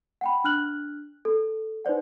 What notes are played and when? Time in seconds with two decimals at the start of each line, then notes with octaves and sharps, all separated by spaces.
0.21 F#5 G5 B5
0.44 D4 F6 F#6 F#7
1.25 A4
1.85 D#4 B4 C5 D5 F#5